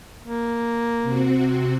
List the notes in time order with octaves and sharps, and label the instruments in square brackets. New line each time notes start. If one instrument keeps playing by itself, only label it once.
[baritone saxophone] A#3
[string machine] C3 C4 F#4